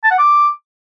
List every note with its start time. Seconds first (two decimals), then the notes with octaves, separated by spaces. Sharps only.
0.04 A5
0.11 F#5
0.18 D6